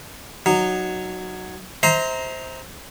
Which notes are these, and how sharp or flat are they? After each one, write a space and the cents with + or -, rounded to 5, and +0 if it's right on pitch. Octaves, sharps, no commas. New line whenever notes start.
F#3 +0 D#4 -20
C5 +0 E5 -40 A#5 +0